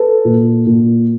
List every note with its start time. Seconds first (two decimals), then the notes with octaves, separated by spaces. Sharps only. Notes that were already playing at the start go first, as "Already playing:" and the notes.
Already playing: A4 B4
0.25 A#2
0.67 A#2